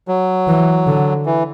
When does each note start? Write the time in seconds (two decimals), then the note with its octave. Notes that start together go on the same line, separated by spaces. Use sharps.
0.08 F#3
0.48 E3
0.87 D3
1.26 E3